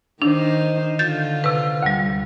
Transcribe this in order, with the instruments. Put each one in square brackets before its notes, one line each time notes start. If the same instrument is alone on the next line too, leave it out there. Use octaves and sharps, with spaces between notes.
[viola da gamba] D#3 D#4 C5 [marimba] D4
[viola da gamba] D3 F4 [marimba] G6 A6
[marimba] C3 B4
D2 G3